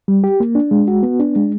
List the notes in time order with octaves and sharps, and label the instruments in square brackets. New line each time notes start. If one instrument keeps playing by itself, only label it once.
[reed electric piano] G3
G4
A#3
D4
G#3
F#4
B3
D4
G#3